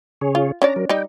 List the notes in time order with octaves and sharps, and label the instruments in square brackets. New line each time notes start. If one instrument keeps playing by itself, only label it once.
[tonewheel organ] C#3 G#4 C#5
[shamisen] F4
[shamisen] C#4 D4 D5 [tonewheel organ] A#5
[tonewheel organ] F#3 A#4
[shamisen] G3 D#4 [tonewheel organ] G5